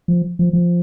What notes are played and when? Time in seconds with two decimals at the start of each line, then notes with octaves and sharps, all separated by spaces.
0.08 F3
0.39 F3
0.53 F3